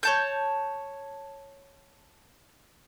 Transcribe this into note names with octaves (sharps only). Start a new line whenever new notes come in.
C#5 A5 G6